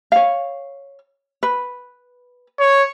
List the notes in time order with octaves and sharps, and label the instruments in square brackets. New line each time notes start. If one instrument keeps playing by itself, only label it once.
[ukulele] C#5 F5
B4
[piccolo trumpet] C#5